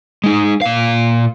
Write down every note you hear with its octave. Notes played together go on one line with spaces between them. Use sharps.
G#3 D#4
A#2 F5